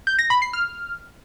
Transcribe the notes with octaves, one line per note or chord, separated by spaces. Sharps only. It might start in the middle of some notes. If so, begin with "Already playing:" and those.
G6
A#6
B5
C7
F6